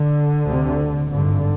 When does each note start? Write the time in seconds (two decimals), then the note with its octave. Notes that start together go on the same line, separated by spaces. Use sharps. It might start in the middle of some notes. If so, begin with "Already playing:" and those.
Already playing: D3
0.46 D2 C3
1.11 G#1 G2 D3